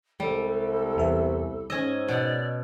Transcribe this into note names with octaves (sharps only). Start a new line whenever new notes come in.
C2 G3 G#3 A4
E2 B3 E5
G#2 C#4 D#5 E6 G#6
B2 D5